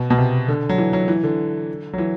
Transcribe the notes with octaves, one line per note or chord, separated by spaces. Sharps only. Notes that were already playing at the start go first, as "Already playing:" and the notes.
Already playing: B2
B2
C3
D3
F#3
E3
F#3
E3
D3
F#3
E3